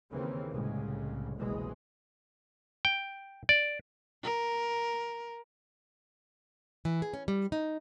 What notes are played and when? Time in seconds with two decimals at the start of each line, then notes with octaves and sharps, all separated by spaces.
0.11 D#2 C#3 E3 A#3 C4
0.50 C2 A2 C#3 G#3
1.36 F#1 C2 B2 E3 G#3
2.85 G5
3.49 D5
4.23 A#4
6.85 E3
7.02 G#4
7.14 C#4
7.28 G3
7.52 D#4